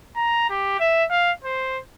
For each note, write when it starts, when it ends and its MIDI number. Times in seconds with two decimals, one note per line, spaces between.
0.16 0.49 82
0.50 0.77 67
0.80 1.05 76
1.10 1.32 77
1.44 1.79 72